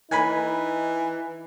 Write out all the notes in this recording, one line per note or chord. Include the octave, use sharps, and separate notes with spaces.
E3 D#4 G#5 B5